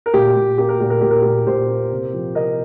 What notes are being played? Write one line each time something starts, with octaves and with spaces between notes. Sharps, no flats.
A#4
A#2 G4
A#2
A#3 G4
A#4
A#2 G4
A#4
A#2 G4
A#4
A#2 G4
A#2 G4 C5
A#3
C3
F3
C3 A#4 D#5